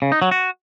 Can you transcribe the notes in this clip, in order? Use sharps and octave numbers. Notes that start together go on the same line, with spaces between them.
C#3
D#4
F#3
F#4